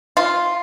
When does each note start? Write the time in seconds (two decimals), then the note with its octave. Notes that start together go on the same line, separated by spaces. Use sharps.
0.17 F4